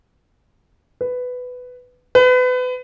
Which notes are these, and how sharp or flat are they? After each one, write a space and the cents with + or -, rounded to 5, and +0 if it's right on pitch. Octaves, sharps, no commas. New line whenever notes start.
B4 +10
B4 +30